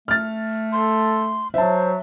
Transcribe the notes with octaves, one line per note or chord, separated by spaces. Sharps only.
A3 F6 A6
A4 C6
F#3 C5 E5 A5